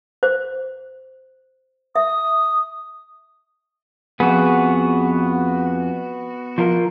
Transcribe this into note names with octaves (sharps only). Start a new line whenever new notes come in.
C5
E5 D#6
F2 B3 F#4 G#4
F3 F4 A#4